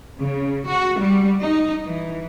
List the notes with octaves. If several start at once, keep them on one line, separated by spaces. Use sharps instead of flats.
C#3
F#4
G3
D#4
E3